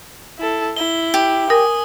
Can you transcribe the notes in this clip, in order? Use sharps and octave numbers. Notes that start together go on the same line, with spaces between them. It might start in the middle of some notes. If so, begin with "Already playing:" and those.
E4 A4
E4 G7
G4
A#4 G#5 D#6